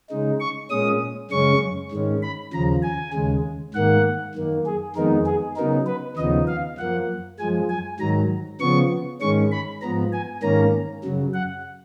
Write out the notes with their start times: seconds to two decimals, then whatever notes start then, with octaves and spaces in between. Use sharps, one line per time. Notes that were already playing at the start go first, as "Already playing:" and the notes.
0.10 C#3 G#3 D#4
0.40 C#6
0.70 A#2 G#3 C#4 D#6
1.31 F#2 C#3 G#3 C#4 C#6
1.91 G#2 D#3 G#3 C#4
2.22 B5
2.53 D#2 C#3 F3 A#5
2.83 G#5
3.14 D#2 C#3 G#3
3.74 G#2 D#3 A#3 F#5
4.35 F#2 D#3 A#3
4.66 G#4
4.96 F2 D#3 G#3 B3 D#4 A#4
5.26 G#4
5.56 C#3 F#3 B3 D#4 A#4
5.86 B4
6.17 D#2 C#3 F3 B3 D#4 D#5
6.47 F5
6.78 F#2 F3 A#3 F#5
7.39 F#2 F3 G#3 G#5
7.70 G#5
8.00 G#2 D#3 F#3 A#5
8.60 C#3 F3 B3 C#6
9.21 G#2 D#3 G#3 C#4 C#6
9.52 B5
9.82 G#2 F3 B3 A#5
10.13 G#5
10.43 G#2 D#3 A#3 C#4 A#5
11.04 F#2 C#3 F#3
11.34 F#5